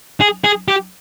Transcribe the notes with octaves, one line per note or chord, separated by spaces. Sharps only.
G#4
G#4
G4